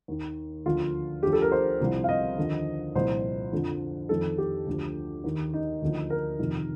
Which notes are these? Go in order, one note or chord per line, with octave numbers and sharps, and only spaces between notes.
D#2 D#3
D2 D3 F3 F4
D2 D3 F3 G4
A4
A#4
C5
C2 C3 F3
F5
D#5
D#2 D3 F3
C2 A#2 F3 C5
F2 D3 F3
F2 D#3 A4
G4
D2 D3 F3
D#2 D#3
D#4
D2 D3 F3
A#4
F2 C3 D#3